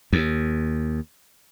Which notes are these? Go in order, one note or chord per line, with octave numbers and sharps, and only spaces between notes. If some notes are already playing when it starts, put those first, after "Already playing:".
D#2